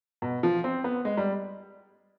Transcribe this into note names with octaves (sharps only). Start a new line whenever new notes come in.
B2
F3
C4
B3
G#3
G3